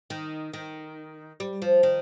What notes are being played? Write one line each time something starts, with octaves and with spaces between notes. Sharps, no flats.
D#3
D#3
G3
F3
D#3